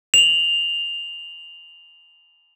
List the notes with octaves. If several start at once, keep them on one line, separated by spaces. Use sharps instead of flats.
F7 F#7